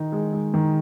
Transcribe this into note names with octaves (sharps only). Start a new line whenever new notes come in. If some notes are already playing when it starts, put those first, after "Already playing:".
Already playing: D#3 D#4
G#3
G#3
D#3